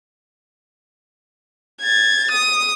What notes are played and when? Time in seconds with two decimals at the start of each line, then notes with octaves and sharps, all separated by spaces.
1.82 G#6 A6
2.31 D#6